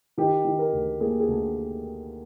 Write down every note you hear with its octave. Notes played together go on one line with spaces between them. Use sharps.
D#3 G4
D#3
A#4
D2
A#3 G#4
G#4
D2